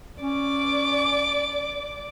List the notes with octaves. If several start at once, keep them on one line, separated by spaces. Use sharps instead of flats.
C#4 D5 D6